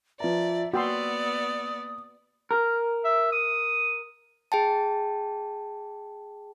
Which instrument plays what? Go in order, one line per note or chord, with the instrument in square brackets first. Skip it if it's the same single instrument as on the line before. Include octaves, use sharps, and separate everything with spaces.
[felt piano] F3 B4 A#5 [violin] D5 [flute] E5
[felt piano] A#3 E6 [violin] B3 D5 [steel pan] F#4 G5 C6 [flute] D#6
[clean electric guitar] A#4
[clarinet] E5
D#6
[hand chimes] G#4 G5 A5